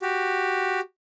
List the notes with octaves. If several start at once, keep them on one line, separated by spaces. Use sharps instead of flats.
F#4 G4